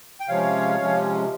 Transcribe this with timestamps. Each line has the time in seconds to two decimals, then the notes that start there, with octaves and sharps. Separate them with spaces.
0.20 G5
0.29 C3 F3 G#3 C#4 C#5 F5
0.80 C3 F3 G#3 C#4